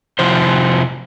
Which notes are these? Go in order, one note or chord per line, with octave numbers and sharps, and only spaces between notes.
C3 F3 E4 C5